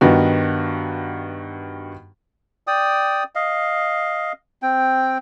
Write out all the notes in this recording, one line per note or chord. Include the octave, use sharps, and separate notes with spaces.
G2 D#3 B3 F#4
D5 G5 D#6
D#5 F5
C4 G5